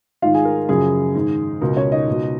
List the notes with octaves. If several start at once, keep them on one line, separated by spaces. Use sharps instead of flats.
G#2 D#3 F4 F5
G#4 G#5
A#4
F#2 C#3 F3 G#4
G#2 D#3
C#2 B2 A#4
C#4 C#5
D#4 D#5
C#2 B2